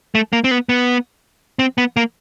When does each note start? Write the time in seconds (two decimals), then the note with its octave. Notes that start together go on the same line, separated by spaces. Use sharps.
0.15 A3
0.33 A#3
0.44 C4
0.51 B3
0.69 B3
1.59 C4
1.78 B3
1.97 A#3